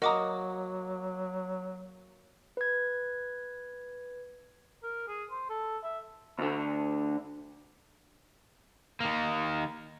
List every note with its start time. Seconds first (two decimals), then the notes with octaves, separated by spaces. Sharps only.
0.02 F#3 A#3 F#4 A#4 D#5 A#5 D6 D#6
2.57 B4 G#6
4.83 A#4
5.08 G#4
5.31 C5
5.49 A4
5.83 E5
6.39 D2 D3
9.00 D#3 A#3